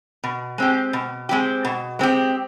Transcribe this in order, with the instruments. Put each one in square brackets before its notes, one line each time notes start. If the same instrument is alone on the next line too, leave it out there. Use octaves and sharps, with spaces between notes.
[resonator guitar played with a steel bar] B2
G#3 C4 G4
B2
G#3 C4 G4
B2
G#3 C4 G4